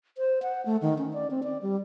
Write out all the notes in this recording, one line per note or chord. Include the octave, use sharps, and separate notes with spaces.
C5
F#5
A3
D#3
C#4
D5
C4
D5
G3